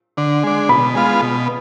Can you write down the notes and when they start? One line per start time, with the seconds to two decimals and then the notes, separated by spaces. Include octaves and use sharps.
0.17 D3
0.44 G#3 D4
0.69 B2 B5
0.95 G#3 B3 F4
1.22 B2